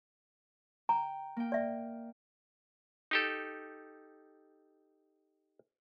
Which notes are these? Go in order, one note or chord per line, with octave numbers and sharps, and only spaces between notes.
G5 A#5
A#3 G5
D5 E5
D#4 G4 A4